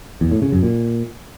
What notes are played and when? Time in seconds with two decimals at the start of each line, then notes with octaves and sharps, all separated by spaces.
0.21 E2
0.31 A2
0.42 C#3
0.52 F#2
0.63 A#2